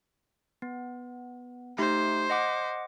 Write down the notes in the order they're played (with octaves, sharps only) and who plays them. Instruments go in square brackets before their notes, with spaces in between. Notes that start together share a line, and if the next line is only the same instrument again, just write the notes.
[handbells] B3
[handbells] A3 D#4 G4 [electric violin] C5
[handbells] D#5 F#5 D6